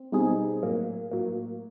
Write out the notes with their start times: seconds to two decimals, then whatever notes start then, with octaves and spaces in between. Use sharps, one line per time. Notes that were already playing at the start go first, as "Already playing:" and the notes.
Already playing: C4
0.12 B2 G3 C4 D#4 G#4
0.63 A2 F#3 A#3
1.12 A2 F#3 A#3